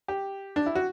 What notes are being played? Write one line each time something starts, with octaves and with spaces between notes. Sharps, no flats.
G4
D4
E4
F#4